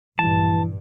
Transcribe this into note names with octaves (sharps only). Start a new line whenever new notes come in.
A#1 G2 E3 A5